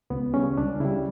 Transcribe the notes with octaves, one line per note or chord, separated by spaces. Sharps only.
C#2 B3
C#3 G3 C#4
C#2 D4
C#3 G3 E4